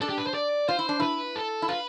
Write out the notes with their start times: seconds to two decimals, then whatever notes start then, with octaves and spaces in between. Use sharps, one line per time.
0.01 D4 A4
0.09 G4
0.18 B4
0.27 C5
0.34 D5
0.68 F4 C5
0.79 E4
0.89 D4
1.00 E4 B4
1.36 A4
1.62 E4
1.68 F4 B4